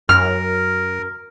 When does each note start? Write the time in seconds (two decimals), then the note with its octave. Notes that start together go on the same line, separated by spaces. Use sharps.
0.09 F#2 A#4 F6